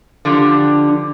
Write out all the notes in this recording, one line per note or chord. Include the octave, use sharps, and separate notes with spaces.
D3 F3 D4 G4